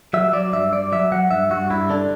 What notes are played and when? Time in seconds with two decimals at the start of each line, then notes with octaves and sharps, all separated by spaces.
0.13 F#3 E5
0.33 F#3 D5
0.53 G2 E5
0.72 G2 D5
0.92 F#3 E5
1.12 F#3 F#5
1.31 G2 E5
1.50 G2 F#4
1.70 G2 E4
1.90 D3 D4